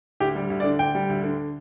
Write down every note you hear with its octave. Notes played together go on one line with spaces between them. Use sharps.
D2 G4
G3
D2
D5
D3
D2 G5
G3
D2
D3